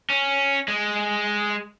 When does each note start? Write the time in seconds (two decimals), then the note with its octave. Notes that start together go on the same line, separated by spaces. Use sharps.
0.10 C#4
0.68 G#3